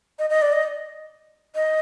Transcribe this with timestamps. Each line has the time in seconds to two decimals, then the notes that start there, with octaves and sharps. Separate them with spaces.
0.19 D#5
0.30 D#5
0.42 D5
0.53 D#5
1.55 D#5